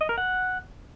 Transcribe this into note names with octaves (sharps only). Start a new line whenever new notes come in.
D#5
A#4
F#5